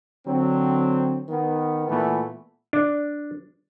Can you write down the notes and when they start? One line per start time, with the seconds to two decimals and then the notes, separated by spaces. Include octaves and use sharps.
0.27 D3 F#3 C4
1.29 D#3 B3
1.89 A#2 E3 A3 B3
2.73 D4